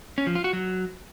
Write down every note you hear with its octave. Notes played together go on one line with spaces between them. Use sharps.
C#4
F3
F4
F#4
F#3